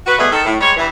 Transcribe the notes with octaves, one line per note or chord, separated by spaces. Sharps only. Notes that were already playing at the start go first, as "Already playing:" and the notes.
F#4 B4
B2 G3 A3 B3 G#4
D#3 A4
A2
G3 G#3 C#5
G2 E3